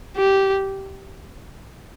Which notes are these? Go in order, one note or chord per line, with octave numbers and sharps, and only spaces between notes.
G4